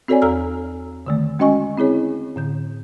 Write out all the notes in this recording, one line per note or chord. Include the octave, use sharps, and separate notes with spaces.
C4 F#4 A4 C#5 D5 G#5
E2 A4 A#5 E6 F6
D3 D#3 A3
G#3 C#4 F#4 D#5 G#5 C#6
C4 E4 G#4 C#5
A2 D3 G6